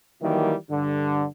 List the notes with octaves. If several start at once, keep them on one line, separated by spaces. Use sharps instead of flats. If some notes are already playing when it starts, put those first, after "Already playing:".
D#3 E3 F#3 G3 A#3
G2 D3